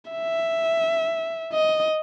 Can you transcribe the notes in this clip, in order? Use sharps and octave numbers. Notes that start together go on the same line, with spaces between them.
E5
D#5